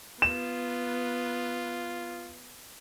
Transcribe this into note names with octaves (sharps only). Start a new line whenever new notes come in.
B3 F4 E7